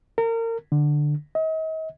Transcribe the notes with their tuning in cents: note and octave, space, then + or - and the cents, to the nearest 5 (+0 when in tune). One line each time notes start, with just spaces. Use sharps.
A#4 -30
D3 +10
D#5 +40